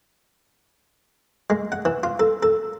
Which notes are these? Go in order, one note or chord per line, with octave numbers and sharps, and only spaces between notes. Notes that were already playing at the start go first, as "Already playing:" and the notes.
G#3
F#5
E3
F4
A4
A4